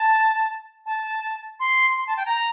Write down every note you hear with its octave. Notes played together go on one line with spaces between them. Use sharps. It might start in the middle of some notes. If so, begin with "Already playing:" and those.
Already playing: A5
A5
C6
C6
A5
G5
A#5